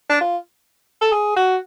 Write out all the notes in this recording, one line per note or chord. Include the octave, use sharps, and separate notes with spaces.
D4
F4
A4
G#4
F#4